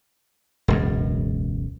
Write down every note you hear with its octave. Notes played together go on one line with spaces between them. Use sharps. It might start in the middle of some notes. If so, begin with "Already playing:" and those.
E1 C#2 F#2